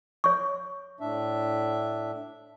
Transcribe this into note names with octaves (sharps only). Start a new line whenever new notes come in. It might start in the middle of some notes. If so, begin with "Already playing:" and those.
C#5 C#6
A2 D4 E5